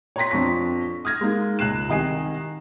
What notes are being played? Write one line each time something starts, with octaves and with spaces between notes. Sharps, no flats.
C#5 G5 A#5 C6 A#6 B6
F2 D4 C#6 B6
D#6 F6 G#6 A#6
G#3 A#3 D#4
C#2 F#6 C7 E7
C2 D#3 D#5 G#5 C7 E7